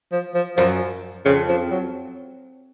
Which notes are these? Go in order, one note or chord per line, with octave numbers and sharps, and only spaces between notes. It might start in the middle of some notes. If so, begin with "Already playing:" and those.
F3
F3
F#2 F3
F2 C#3
F3
F#3